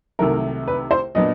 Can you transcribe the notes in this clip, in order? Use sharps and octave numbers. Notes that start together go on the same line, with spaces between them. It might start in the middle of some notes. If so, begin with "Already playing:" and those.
C2 C3 D#3 F#3 A3 A#4
B4
C5
A#2 F#3 B3 D4 D#5